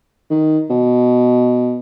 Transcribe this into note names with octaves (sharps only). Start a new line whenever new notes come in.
D#3
B2